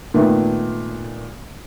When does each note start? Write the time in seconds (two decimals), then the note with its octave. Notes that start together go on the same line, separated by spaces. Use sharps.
0.14 A#2 D#3 A3 B3